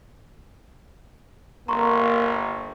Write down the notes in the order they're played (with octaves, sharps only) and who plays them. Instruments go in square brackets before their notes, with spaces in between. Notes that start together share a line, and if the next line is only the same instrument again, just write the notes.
[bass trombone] G1 [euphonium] A#3 [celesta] A#5 C6 C#6